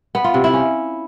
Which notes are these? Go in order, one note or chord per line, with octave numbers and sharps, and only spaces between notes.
B3
F4
C3
E4
C#4